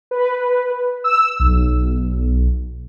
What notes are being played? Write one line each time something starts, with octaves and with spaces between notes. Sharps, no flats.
B4
E6
B1